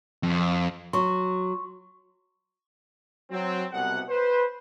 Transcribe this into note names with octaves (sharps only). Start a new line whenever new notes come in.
F2
F#3 C6 C#6
F#3 C4
C2 B2 F#5
B4 C5